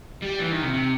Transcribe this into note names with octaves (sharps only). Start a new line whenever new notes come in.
G3
E3
D#3
C3
C3